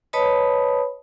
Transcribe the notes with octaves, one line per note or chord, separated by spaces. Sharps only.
B4 C#5 D#5 A5 B5 D#6